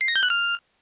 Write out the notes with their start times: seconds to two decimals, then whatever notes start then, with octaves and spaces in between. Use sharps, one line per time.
0.01 C7
0.08 A#6
0.16 G6
0.23 F#6
0.30 F6